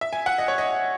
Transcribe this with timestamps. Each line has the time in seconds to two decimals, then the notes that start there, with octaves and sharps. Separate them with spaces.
0.01 E5
0.13 G#5
0.26 F#5
0.38 D#5
0.48 C#5
0.58 D#5